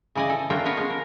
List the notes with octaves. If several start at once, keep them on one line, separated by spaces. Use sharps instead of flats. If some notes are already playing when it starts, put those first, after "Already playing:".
C#3 E3 D5 D#5 G#5
A4
A3 A#3 D4 F4 A#4 G5
B3 A#4 C#5 F5
F3 G#3 C#4
A#4